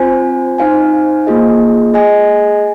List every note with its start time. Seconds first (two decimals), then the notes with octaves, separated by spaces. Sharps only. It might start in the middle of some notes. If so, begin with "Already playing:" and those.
Already playing: C4 F4 C5 G#5
0.58 D#4 C5 F5 G#5
1.27 A#3 F4 G#4 D#5
1.94 G#4 D#5 G#5